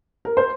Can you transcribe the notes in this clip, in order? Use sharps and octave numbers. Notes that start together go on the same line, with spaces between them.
A#4
C5